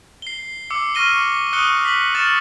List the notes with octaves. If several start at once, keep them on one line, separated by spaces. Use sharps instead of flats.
C7 G7
D6 E6 C#7
C#6 E6 F6 A#6 D#7 G7
C#6 D#6 F#6 C#7 D#7 G7
B6 F#7
C#6 F6 A6 C#7 E7 F#7